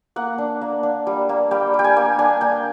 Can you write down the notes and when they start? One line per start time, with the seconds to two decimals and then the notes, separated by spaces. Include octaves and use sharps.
0.16 A#3 F#5
0.38 D4
0.61 A#3
0.83 D4
1.07 G3
1.29 A#3
1.51 G3 G5
1.74 G3
1.79 G5
1.84 G#5
1.97 A#3
2.19 D4 G#5
2.41 A#3 G5